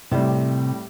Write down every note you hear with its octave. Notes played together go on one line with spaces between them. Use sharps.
A2 C3 G3